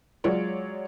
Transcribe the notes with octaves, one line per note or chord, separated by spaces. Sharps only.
F#3 G#3 F4 C#5 D5